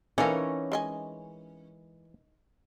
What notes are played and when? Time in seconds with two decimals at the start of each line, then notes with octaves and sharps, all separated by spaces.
0.18 E3 C#4 D#4 A4 A#4 C#5 F5
0.72 G#3 D#5 G#5